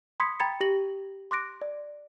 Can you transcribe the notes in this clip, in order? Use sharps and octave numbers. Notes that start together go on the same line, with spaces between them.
B5 C6 D#6 G#6 B6 C#7
G5 A#5 B5 G#6 A6 C#7
G4 A#6 F#7
C6 D6 F#6 A#6 D7
D5